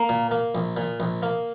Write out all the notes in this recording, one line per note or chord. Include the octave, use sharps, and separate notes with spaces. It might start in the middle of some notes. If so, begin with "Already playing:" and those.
Already playing: A#3
A#2
A#3
A#1
A#2
A#1
A#3